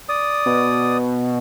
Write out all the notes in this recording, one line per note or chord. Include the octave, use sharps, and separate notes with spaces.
D5 D#6
B2